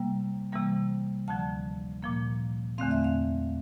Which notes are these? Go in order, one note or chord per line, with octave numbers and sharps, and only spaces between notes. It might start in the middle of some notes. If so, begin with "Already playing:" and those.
Already playing: C3 G3 A#3 G5
C3 E3 G3 A#3
D2 D3 F3 A5
A#2 F3 A#3
E2 D3 A3 C4 F5
E5
F5